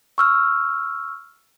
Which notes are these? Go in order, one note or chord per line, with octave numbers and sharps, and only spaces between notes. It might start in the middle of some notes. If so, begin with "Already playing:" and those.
C#6 E6 F6